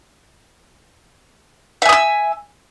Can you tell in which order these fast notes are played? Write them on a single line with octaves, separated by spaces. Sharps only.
E5 G#5 D#6 E6